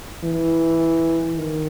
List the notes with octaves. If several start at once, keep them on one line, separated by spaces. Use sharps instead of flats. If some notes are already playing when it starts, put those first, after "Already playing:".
E3
D#3